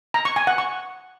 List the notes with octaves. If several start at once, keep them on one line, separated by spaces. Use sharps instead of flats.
A#5
C#6
G#5
F#5
C#6